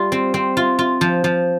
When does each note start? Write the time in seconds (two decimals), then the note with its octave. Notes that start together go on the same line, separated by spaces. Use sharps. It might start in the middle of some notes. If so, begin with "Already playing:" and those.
Already playing: G3 F4
0.12 C4
0.34 C4
0.57 F4
0.79 F4
1.01 F3
1.24 F3